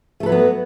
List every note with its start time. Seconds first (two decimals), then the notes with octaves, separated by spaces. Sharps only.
0.20 A3
0.23 A4
0.26 B4
0.29 F#3
0.32 B3